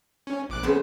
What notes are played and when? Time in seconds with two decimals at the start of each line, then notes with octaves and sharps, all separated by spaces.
0.27 C#4
0.49 A#1 D6 F#6
0.63 F2 C#3 B3 C5